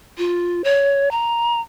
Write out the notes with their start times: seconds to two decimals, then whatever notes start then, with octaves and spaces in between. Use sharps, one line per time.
0.18 F4
0.64 C#5
1.11 A#5